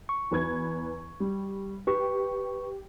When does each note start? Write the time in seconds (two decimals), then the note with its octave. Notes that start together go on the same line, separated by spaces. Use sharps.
0.09 C#6
0.31 E2 B4 G#6
1.20 G3
1.87 G4 B4 C#6